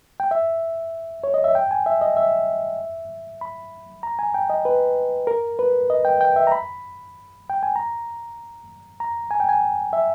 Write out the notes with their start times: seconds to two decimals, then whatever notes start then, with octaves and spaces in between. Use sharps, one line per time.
0.20 G5
0.31 E5
1.24 C#5
1.34 D#5
1.44 E5
1.55 G5
1.71 G#5
1.86 E5
2.01 D#5
2.17 E5
3.41 B5
4.03 A#5
4.19 G#5
4.34 G5
4.50 D#5
4.65 B4
5.27 A#4
5.59 B4
5.90 D#5
6.05 G5
6.21 G5
6.36 E5
6.47 A#5
6.52 B5
7.50 G5
7.63 G#5
7.76 A#5
9.00 A#5
9.31 G#5
9.40 G5
9.49 G#5
9.93 E5